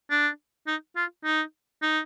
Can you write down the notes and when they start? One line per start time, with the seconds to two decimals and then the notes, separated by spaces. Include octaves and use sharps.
0.11 D4
0.67 D#4
0.96 F4
1.25 D#4
1.82 D#4